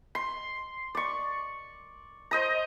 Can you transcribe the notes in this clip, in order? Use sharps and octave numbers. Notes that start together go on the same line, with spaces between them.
C6
D5 C#6
C5 D#5 A#5